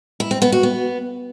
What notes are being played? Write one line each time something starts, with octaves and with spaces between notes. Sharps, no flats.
E4
C4
B3
F#4
B3